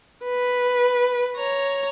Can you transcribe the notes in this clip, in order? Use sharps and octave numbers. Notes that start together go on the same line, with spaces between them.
B4
C#5 A#5